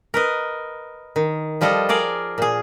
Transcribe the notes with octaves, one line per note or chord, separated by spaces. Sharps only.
A#4 B4 D#5
D#3
F3 G3 F4 A4 D#5
G#4 A#4 D5 F5
A#2 G#4